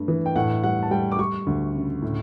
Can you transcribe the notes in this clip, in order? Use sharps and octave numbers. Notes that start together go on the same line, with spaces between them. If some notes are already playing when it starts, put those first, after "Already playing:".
Already playing: G2 A3
E3
G5
A2 F#5
G3 F#5
A5
G3 G5
D6
G3 C#6
D2
C#3
A2